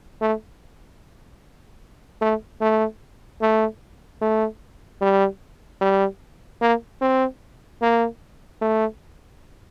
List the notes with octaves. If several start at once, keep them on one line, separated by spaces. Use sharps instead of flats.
A3
A3
A3
A3
A3
G3
G3
A#3
C4
A#3
A3